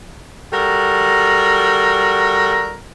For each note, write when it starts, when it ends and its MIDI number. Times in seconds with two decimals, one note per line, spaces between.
0.52 2.79 55
0.52 2.79 66
0.52 2.79 69
0.52 2.79 70